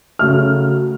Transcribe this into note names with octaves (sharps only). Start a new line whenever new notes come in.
C#3 F#3 A3 F6